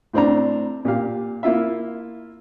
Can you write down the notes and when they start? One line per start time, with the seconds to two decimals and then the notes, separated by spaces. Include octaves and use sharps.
0.13 A2 C4 D4 A#5
0.85 A#2 G4 F5
1.43 A#3 E4 F4 E5